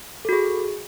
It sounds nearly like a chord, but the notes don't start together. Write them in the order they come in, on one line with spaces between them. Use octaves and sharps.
A4 F#4 G#4